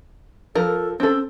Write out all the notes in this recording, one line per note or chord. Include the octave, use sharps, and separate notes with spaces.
F3 A4 A#4
C4 C#4 A4